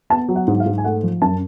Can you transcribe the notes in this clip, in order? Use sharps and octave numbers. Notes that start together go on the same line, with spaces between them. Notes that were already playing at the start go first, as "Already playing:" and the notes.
B3 A5
F#3
F#5
G#2
F5
G#2
G#5
A3 F#5
F3
F#2 A5